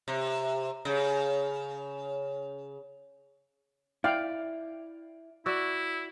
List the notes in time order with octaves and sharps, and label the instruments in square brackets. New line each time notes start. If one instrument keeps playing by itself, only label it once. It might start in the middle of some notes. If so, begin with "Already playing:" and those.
[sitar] C3
C#3
[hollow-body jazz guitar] E4 [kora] D5 [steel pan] F5 G5
[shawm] E4 [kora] F#4 D5 [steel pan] E6